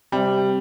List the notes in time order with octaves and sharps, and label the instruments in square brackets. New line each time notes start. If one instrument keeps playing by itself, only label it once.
[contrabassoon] C3 [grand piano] G3